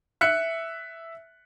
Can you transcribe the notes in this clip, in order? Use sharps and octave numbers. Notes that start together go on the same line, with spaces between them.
E5 F#6 C#7